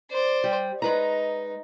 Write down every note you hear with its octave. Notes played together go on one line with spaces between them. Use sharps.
C5 D5
G3
G#3 D#4 B4 A#5